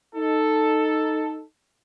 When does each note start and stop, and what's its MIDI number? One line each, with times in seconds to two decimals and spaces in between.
0.15 1.42 63
0.15 1.42 69